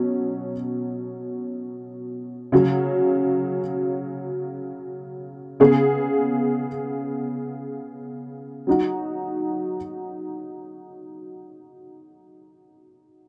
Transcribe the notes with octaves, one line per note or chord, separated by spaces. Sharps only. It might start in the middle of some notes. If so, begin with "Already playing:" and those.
Already playing: B2 F#3 C#4
C#3 F#3 C#4
C#3 B3 G#4
F#3 D#4 F#4